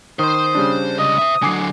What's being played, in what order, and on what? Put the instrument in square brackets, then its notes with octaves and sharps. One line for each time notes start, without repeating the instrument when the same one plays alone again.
[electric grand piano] D#3 [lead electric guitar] C5 C6 [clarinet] D#6
[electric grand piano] C#3 G3 D4
[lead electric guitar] C#2 D#5 [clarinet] D#6
[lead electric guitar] C5 E5
[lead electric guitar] D3 F#3 [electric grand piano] G#5 D6 C7